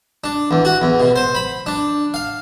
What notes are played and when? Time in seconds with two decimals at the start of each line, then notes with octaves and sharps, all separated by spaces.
0.24 D4
0.51 E2
0.65 F#4
0.82 E2
1.00 B2
1.16 C5
1.35 B5
1.66 D4
2.14 F5